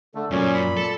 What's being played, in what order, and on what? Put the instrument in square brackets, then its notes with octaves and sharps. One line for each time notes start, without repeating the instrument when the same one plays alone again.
[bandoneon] D3 A3 [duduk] A4
[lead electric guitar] F#2 [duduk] A#2 [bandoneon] C#4
[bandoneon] B5
[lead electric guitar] A4